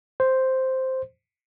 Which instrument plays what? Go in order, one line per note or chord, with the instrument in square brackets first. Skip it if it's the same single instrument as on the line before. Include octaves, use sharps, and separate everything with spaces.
[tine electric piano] C5